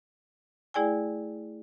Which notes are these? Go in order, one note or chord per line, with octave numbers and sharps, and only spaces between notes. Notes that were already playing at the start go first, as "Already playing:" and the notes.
A3 E4 G#4 D5 G5 G#5